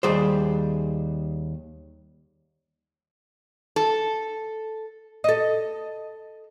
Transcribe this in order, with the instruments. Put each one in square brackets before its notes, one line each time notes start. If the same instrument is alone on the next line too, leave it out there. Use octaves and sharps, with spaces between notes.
[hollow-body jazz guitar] D#2 G3 G#4 C5
[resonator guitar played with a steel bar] A4
[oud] A4 D#5